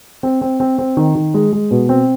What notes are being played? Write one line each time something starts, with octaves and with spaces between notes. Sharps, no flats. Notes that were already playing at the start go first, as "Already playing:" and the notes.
C4
C4
C4
C4
D#3
D#3
G#3
G#3
B2
C4